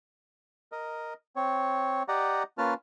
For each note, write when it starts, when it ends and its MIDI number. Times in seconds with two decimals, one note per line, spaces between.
0.72 1.14 70
0.72 1.14 75
1.36 2.03 60
1.36 2.03 73
2.08 2.43 67
2.08 2.43 74
2.08 2.43 75
2.08 2.43 78
2.08 2.43 82
2.58 2.74 58
2.58 2.74 61
2.58 2.74 65
2.58 2.74 71
2.58 2.74 81
2.58 2.74 89